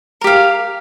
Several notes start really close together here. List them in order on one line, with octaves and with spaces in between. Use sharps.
A#4 G4 F5